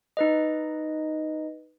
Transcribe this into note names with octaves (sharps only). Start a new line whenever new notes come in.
D#4 B4 D#5